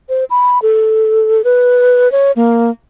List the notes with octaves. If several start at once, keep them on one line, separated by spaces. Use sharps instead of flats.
C5
B5
A4
B4
C#5
A#3